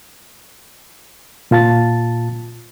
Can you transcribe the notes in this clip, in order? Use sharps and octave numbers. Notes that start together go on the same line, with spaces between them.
A#2 F4 A5 A6